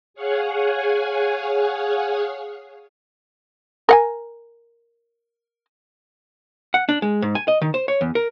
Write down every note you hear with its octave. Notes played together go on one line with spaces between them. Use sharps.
G#4 C#5 F5 F#5 G#5
A#4 F#5 G#5
F#5
D4
G#3
G#2
G#5
D#5
D#3
C5
C#5
E2
A#4